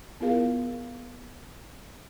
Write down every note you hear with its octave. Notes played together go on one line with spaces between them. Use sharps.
B3 E4 F4 G#4 A#4 F5